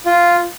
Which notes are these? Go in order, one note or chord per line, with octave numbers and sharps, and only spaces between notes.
F4